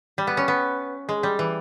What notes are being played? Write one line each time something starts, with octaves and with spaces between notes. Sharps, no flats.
G3
B3
C#4
B3
G#3
G3
E3